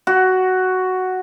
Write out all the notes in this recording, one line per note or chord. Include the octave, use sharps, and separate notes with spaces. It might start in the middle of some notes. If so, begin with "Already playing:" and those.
F#4